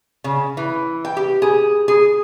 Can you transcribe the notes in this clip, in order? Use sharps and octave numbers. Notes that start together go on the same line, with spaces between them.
C#3
E3
G5
G4
G#4
G#4